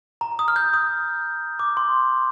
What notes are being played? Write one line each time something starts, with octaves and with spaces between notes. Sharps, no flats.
A#5
D#6
F6
G6
D#6
D6
C6